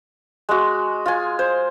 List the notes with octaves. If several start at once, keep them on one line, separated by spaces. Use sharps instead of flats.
G#3 F#4
F4 G#5
C5